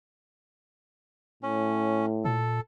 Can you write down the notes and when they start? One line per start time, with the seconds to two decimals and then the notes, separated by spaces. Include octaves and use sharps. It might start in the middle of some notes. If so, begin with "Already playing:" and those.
1.43 A2 C#4
2.25 A#2 A4